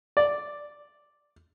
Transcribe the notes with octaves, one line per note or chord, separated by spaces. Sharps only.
D5